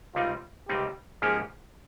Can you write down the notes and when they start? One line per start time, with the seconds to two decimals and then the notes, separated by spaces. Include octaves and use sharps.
0.15 C#2 C3 G3 C4 D#4 F4
0.68 C#2 C3 G3 C4 D#4 G4
1.22 G#2 F3 A#3 C#4 G4 G#4